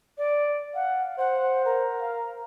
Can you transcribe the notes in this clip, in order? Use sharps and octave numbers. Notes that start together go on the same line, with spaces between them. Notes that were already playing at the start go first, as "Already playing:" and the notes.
D5
F5 F#5
C5 F#5
A#4
F5